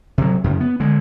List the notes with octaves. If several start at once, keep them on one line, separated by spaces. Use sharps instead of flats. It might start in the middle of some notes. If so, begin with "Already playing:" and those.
C3 F#3
F#2 C#3
B3
D3 G#3